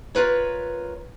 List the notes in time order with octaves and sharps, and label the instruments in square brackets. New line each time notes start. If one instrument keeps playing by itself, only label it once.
[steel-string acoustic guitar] F4 A#4 B4 C#5